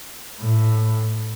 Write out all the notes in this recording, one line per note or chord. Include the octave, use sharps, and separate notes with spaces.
A2